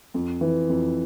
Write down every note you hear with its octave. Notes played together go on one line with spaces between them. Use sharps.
F2
E3
F2